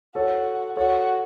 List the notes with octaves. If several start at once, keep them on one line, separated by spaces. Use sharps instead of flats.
F#4 A4 C#5
F#4 A4 C#5